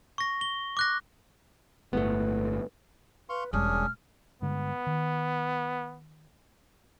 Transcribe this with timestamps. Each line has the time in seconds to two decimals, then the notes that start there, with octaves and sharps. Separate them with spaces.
0.18 C#6 A#6
0.41 G7
0.77 D6 F#6 A#6
1.93 G1 A2 A3 B3
3.29 B4 F5 C6 C#6
3.53 E1 G3 C#4 D4 G#4 F6
4.42 G2 D3 G#3 B3
4.87 D#3